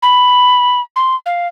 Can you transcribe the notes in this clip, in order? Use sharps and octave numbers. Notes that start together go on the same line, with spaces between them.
B5
C6
F5